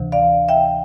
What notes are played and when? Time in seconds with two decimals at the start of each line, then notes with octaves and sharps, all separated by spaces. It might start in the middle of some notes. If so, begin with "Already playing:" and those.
Already playing: D2 C3 E3
0.12 D5 F5
0.49 E5 G5